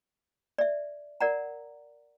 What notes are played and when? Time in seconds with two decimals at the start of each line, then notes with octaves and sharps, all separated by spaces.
0.58 D5 E5
1.21 A#4 D5 F#5 A#5